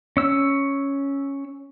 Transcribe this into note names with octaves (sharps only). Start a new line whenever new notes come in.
C#4 E6